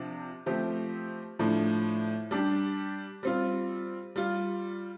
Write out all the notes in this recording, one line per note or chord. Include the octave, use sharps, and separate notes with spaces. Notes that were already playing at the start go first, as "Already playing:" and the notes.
Already playing: C3 F3 D4 F4
F3 A3 C4 G4
A2 F3 D4
G3 D4 G4
G3 C4 F4
G3 F4